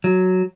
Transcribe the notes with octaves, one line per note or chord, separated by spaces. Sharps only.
F#3